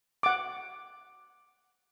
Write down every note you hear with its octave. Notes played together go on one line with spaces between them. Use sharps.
F#5 D6